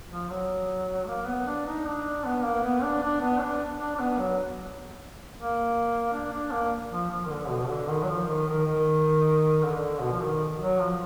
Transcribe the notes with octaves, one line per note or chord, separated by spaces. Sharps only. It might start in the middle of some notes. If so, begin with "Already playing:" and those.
F3
F#3
A#3
B3
D4
D#4
D4
B3
A#3
B3
D4
D4
B3
D4
D4
D4
B3
F#3
A#3
D4
D4
A#3
F3
F3
D#3
D3
B2
D3
D#3
F#3
F3
D#3
D#3
D#3
D3
B2
F3
D#3
F#3
F3